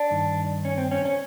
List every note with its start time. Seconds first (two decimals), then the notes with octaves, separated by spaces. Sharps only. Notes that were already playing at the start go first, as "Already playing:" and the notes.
Already playing: D4
0.11 G2 D#3
0.65 C#4
0.78 C4
0.91 C#4
1.05 C#4